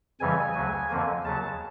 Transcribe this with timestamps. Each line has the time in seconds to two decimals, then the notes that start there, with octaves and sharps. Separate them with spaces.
0.20 F2 C#3 E3 G3 G#5
0.54 D2 C#3 F#3
0.89 F2 D3 F3 A#3
1.24 D#2 C#3 F#3 A5